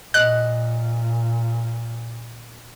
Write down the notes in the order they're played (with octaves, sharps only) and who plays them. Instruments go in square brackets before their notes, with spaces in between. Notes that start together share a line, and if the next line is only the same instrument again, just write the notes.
[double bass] A#2 [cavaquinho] D#5 [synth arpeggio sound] F#6